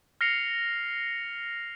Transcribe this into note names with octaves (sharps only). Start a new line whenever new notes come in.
F6 A#6 C7 C#7 F7